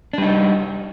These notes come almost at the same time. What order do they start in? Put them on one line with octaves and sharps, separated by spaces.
D4 G3 D#4